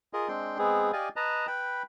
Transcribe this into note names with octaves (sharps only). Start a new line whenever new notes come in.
F4 G#4 A#4 D#5
G#3 C4 D4 G5 C6
G#3 B3 C4 G#4
G4 D5 D#5 F5 G#5
B4 D#5 A5 A#5
B4 G5 B5